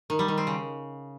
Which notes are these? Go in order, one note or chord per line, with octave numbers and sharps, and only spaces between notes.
D#3
G3
D#3
C4
C#3